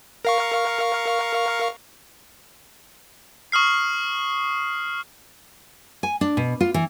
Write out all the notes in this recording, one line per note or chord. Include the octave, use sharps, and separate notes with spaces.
A#4 F5 C#6
C#6 D#6 F6 C7
G#5
D4
B2
F4
E3